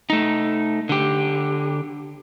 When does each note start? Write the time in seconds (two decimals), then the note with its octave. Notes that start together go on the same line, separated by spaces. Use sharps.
0.10 A3 D#4
0.89 D3 G4